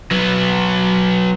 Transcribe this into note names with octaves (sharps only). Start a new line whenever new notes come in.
F#3 B3